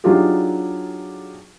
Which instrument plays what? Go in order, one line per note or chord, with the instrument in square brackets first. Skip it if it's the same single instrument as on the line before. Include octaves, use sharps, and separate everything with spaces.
[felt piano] F#3 D4 D#4 F4 G4 G#4